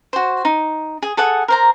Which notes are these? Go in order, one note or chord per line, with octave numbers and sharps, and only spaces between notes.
F#4 C5
D#4
G#4
G#4 A4 F#5 D#6
A#4 C5 A#5